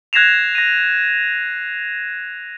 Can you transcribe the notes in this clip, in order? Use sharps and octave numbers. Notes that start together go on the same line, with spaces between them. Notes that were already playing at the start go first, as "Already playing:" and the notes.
F#6 G#6 A#6 C7 E7 F7
A#6 D#7